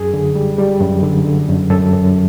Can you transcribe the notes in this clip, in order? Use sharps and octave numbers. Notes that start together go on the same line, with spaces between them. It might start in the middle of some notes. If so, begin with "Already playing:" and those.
Already playing: F#2 G#4
D3
G3
G3
F#2
D3
D3
F#2
F#2 A4
F#2